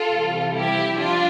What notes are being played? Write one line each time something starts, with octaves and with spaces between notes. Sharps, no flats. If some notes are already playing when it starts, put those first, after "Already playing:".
Already playing: F4 A4
C3 E3 G3
E4 G4
F3 D4 F4